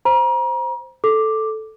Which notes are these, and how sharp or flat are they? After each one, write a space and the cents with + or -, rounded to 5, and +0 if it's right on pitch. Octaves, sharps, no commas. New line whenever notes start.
C5 +0 A#5 +35
A4 +0 D6 +5